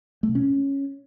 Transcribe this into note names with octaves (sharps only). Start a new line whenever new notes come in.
A3
B2
C#4